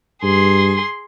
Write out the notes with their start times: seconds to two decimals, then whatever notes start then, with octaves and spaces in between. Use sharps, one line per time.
0.23 G2 G#4 C6